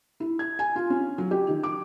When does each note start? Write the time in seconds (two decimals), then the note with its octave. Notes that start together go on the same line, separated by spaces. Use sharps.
0.20 E4
0.39 G#6
0.59 G#5
0.76 F4
0.90 C#4
1.18 F#3
1.31 G4
1.49 D#3
1.63 D6